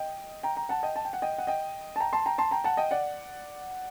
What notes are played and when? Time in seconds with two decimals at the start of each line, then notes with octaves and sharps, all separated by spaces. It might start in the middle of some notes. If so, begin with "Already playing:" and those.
Already playing: D#5 G5
0.43 G5 A#5
0.56 G5 A#5
0.69 F#5 A5
0.83 D#5 G5
0.96 A5
1.05 G5
1.13 F#5
1.22 D#5 G5
1.38 F#5
1.47 D#5 G5
1.96 A5
2.00 G5 A#5
2.13 A5 C6
2.26 G5 A#5
2.38 A5 C6
2.51 G5 A#5
2.64 F#5 A5
2.77 D#5 G5
2.91 D5 F#5